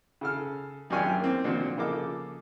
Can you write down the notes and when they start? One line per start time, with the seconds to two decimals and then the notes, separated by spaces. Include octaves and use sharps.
0.21 C#3 A4 F6
0.90 G#1 F#2 D4 G4 C#5 G#5
1.19 A#3 C4
1.44 A#2 D3 D#3 F3 C4 F#4
1.77 C#3 F3 A#3 A4 D#5 D6